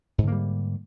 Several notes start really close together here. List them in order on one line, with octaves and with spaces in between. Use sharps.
G#2 D3 A#3 G3